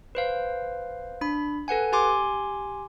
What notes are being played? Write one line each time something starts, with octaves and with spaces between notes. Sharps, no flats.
B4 C5 F5
D4 B5
A4 B4 F#5 G#5
G4 G#5 C6 D6